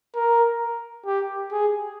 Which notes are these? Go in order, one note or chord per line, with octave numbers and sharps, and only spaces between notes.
A#4
G4
G#4